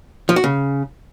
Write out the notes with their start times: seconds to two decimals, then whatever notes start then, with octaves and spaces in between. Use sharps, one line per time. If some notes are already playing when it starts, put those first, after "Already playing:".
0.29 F3
0.36 F#4
0.44 C#3